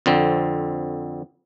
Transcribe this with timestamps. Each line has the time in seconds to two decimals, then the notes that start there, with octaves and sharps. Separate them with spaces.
0.06 F2 D3 C4